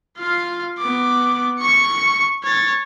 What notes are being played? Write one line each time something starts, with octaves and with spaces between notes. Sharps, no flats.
F4 F5
B3 D6
C#6 C#7
C#5 A6